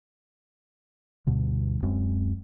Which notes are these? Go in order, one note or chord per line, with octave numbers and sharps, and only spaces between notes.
D2 G2 B2 D3
D1 F#2 G#3 C4